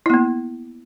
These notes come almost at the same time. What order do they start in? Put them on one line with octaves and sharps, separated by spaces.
E4 B3 A#3